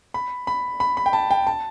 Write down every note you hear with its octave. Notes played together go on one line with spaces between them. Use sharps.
B5
B5
B5
B5
G5
A5
G5
A5